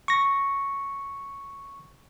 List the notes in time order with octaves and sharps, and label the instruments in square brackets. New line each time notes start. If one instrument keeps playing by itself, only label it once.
[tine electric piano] C#6 A#6